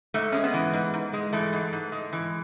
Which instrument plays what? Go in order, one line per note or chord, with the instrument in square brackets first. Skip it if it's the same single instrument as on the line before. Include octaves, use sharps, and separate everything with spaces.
[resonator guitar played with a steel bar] G#2 A3
G#3 C#4
B3
E3
G#2
G#2
G#3
E3 A3
G#2
G#2
G#3
E3